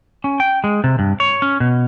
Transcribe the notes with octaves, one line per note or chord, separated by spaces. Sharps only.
C#4
G5
G#3
C3
G2
C#5
C#4
B2